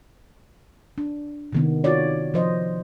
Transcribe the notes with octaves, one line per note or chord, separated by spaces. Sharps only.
D4
C3 D#3 B3
C4 D#4 F4 F#4 C#5 D5
F3 C5 D#5